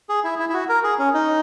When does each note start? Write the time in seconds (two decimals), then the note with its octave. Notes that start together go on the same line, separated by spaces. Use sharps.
0.09 G#4
0.24 E4
0.39 E4
0.49 E4
0.54 F#4
0.69 A#4
0.84 G#4
0.99 C#4
1.14 D#4